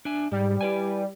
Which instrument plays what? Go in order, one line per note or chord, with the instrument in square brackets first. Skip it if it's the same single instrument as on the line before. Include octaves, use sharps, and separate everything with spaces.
[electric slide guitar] D4 E5 G#5
[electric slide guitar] G#2 [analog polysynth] G3
[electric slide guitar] E4 B4 G#5